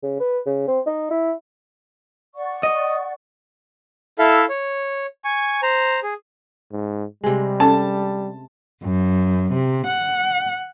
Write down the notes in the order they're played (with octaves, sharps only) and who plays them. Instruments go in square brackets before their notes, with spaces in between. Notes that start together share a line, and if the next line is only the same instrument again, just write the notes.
[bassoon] C#3
B4
C#3
C4
D#4
E4
[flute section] D5 F#5 C#6
[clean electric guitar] D#5
[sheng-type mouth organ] E4 A4 E5 F5
C#5
G#5 C#6
C5 A#5
G#4
[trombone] G#2
[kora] C3 G#3 [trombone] G3
[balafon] C#4 A4 [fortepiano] A5
[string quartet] F#2
C3
F#5